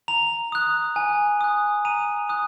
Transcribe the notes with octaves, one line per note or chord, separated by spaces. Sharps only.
A#5 F7
D#6 F#6
G#5
D#6 F#6
A#5 D#7
D#6 F#6